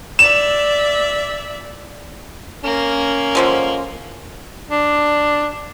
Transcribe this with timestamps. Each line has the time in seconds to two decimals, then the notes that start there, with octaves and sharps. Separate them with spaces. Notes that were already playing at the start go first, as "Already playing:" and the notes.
0.19 D5 E5 E7
2.64 A#3 C#4
3.35 D3 F3 G#3
4.70 D4